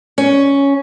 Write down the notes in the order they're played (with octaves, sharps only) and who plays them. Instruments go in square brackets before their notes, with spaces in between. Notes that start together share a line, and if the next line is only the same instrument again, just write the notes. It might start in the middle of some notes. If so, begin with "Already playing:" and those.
[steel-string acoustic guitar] C#4